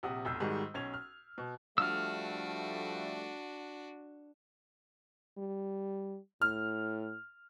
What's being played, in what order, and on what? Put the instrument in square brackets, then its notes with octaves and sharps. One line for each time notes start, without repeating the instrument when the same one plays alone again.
[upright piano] A#1 C3 G4 F#5 D#6
F1 B1 E6 G6
G#2 D#3 G3 G#3 F#4
B1 C#4 G#6 F7
F6
B2
[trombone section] F3 G3 A3 [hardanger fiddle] D4 F#4 [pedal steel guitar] E6 F6
[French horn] G3
[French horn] A2 [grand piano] F6